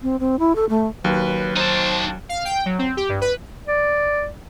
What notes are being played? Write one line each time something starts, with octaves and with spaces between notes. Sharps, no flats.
C4
C4
E4
A4
A3
D#2 F#3 B4
D#4 C5 A5
F5
G5
F#3
C4
G4
G2
B4
D5